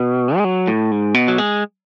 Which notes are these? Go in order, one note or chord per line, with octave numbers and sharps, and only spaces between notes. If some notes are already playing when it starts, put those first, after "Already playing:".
Already playing: B2
G#3
F#3
A2
G#2
B2
F#3
G#3